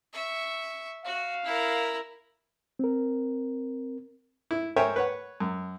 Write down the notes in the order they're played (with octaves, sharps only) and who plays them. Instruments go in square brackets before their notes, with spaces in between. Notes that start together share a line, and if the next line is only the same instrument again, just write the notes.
[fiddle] E5 C#6
[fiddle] F#4 [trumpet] F5
[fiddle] E4 A#4
[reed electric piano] C4 A#4
[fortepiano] E4
A#4 C5 C#5 E5 G5 G#5
B4 C#5 F#5
F#2